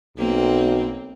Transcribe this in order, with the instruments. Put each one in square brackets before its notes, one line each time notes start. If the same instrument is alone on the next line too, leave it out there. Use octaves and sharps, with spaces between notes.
[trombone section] B1 [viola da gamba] A#3 C4